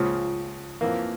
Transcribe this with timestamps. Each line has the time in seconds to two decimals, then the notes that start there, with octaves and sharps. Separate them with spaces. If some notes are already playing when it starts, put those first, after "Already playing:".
Already playing: C#2 C#3 F3
0.81 F2 E3 A#3